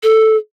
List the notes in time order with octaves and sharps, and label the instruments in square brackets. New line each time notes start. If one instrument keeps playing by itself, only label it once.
[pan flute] A4